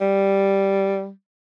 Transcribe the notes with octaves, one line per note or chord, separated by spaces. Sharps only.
G3